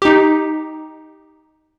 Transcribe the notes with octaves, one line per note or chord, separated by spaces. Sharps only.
D#4 G4